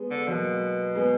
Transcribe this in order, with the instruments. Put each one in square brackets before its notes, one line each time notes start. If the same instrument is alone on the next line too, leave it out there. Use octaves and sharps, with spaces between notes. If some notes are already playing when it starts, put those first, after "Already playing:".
Already playing: [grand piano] G#3 B3
[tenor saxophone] D3
[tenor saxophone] B2 [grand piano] F#3 A#3
[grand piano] G#3 B3